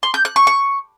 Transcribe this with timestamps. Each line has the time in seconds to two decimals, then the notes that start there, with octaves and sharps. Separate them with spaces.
0.03 C6
0.14 G6
0.25 F#6
0.36 C#6
0.47 C#6